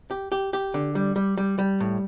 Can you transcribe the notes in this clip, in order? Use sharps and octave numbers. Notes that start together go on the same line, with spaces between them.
G4
G4
G4
D3
G3
G3
G3
G3
A2